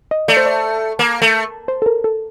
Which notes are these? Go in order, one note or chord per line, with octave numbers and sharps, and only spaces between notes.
D#5
A3 D5
C5
D5
A#3
A3
C5
A4
A#4
A4